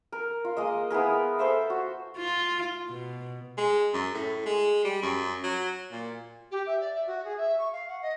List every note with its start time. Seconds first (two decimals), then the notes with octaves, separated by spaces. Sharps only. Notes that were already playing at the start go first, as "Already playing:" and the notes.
0.12 A#4
0.45 F4
0.57 G#3 A#3 D#5
0.90 B3 E4 G#4 A#4
1.39 A4 C5 E5 F5
1.70 F#4
2.17 F4
2.89 B2
3.58 G#3
3.94 F#2
4.15 A2
4.46 G#3
4.85 G3
5.03 F#2
5.44 F#3
5.92 A#2
6.51 G4
6.66 E5
6.81 D5
6.94 E5
7.07 F#4
7.24 G#4
7.37 E5
7.58 C#6
7.72 F5
7.88 F#5
8.02 D#5